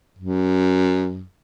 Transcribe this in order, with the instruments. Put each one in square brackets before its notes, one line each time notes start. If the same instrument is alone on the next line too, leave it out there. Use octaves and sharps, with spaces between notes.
[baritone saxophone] F#2